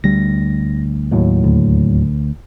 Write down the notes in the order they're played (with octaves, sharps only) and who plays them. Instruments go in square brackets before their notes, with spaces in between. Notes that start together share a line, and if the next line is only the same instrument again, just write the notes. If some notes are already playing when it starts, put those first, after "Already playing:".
[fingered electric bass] D2 G3 [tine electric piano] A#6
[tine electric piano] D#2 A2 F#3
[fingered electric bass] D2